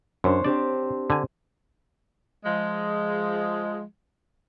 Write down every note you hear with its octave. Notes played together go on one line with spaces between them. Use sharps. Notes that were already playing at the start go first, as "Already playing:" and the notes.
F#2 D4 C5 C#5
C4 D4 G4 D5
D3 G#5
F3 G#3